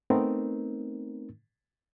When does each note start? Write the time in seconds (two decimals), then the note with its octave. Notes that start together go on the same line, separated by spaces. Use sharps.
0.10 A3 B3 C4 D#4 A#4